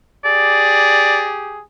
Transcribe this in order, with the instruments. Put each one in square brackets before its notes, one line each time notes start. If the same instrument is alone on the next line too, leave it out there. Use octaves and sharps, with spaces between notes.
[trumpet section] G4 G#4 [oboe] D5